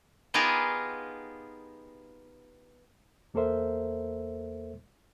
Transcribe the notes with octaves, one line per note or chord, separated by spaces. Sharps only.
B3 D#4 F4 G4 G#4 A#4
E2 A#3 A4 A#4 C5 E5